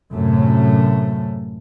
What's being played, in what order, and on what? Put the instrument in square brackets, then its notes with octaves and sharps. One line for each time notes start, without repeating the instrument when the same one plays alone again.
[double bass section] F#2 A2 C3 A3